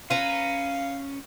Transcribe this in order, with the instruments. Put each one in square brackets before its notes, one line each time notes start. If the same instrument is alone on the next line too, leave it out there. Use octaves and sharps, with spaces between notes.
[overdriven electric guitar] C#4 [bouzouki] B4 A#5 [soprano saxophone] F5